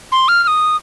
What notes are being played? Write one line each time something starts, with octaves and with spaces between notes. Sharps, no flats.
C6
F6
F6
D#6